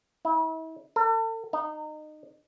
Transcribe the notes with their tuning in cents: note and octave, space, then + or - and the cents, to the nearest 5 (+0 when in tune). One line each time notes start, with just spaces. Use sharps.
E4 -40
A4 +40
D#4 -25